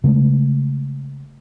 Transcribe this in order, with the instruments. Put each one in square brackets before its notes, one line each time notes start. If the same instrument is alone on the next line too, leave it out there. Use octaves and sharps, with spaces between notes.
[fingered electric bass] C#3 G#3 A3